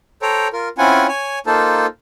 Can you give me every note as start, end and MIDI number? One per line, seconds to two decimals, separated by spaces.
0.22 0.48 69
0.22 0.48 72
0.22 0.48 73
0.22 0.48 79
0.22 0.48 82
0.53 0.69 65
0.53 0.69 70
0.78 1.07 60
0.78 1.07 61
0.78 1.07 64
0.78 1.07 65
0.78 1.07 78
0.78 1.07 80
1.08 1.39 73
1.08 1.39 80
1.46 1.86 58
1.46 1.86 63
1.46 1.86 65
1.46 1.86 69
1.46 1.86 72
1.46 1.86 81